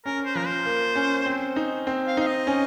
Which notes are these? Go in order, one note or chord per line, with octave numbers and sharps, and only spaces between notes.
C#4 A#4
C5
F3 A#4
C5
A#3
C#4
C4
D#4
C4
F5
D#4 F5
D#5
C#4